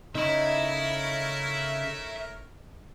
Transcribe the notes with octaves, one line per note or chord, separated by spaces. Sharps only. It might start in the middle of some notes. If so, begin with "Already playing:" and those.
C#3 A3 D#4 A#4 C#5 E5 B5